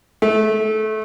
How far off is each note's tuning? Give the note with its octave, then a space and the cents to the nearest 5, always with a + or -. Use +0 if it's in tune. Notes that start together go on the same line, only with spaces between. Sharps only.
A3 -20